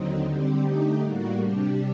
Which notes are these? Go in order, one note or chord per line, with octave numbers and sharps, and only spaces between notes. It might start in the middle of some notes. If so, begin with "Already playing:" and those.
Already playing: D#2 D3 F#3 C4 D#4
D3 G3 C4 G4
D3 A3 D#4 G4
A2 G3 A#3 F#4
C3 G3 D4 G4